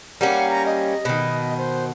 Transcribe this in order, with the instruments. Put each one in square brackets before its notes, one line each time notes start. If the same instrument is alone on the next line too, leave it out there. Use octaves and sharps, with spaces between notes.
[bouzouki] G3 A#3 C#4 [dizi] F#5
[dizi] A#5
D#5
[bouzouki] B2 D#3
[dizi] C5